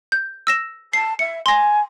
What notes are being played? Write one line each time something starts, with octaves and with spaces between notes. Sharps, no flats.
G6
E6 A#6 E7
A5 C7
E5 C#7
G#5 C6 A#6